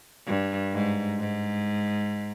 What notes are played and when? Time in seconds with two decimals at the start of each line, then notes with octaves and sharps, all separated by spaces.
0.27 G2
0.73 G#2
1.20 G#2